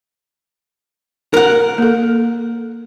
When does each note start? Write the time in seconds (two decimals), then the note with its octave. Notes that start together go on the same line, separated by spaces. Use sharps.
1.34 A#4 F#5
1.78 A#3 A4